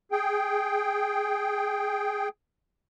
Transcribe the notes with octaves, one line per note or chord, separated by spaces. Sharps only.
G#4 G5